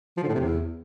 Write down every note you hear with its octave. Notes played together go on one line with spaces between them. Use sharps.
F3
D3
A2
C3
E2